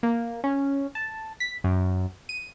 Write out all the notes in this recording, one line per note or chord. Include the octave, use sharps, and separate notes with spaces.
A#3
C#4
A5
B6
F#2
D#7